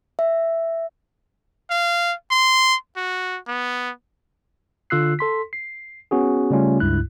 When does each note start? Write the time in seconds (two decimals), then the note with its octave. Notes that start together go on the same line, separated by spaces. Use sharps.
0.19 E5
1.71 F5
2.31 C6
2.97 F#4
3.48 B3
4.90 D3 F4 E6 F#6 C7
5.19 A4 C6 B6
5.53 C7
6.11 B3 C#4 F#4 G#4
6.51 C#3 G3 A3 C#4 F4
6.80 C#2 G2 E4 F#6